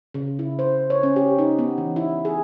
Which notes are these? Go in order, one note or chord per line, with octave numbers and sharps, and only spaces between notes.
C#3
E4
C5
C#5
C#4
G4
D#4
B3
E3
E4
G#4